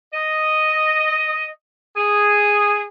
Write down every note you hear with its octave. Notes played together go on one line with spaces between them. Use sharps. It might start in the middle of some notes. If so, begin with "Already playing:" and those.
D#5
G#4